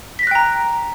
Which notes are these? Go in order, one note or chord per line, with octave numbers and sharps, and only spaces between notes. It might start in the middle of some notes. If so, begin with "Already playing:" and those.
G5 A#5 F#6 A#6 B6